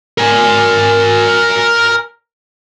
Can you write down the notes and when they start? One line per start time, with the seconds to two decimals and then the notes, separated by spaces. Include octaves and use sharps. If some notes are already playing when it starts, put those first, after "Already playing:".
0.18 A#4 G#5